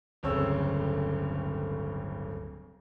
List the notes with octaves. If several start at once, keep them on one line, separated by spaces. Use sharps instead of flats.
D1 G1 C#3 C4 C#5 E6